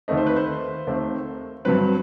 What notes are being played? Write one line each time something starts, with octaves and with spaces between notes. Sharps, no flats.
D#2 D#3 A3 C4 D#5
C5
B4
C5
D#2 D#3 A3 C4
G2 F#3 C4 B4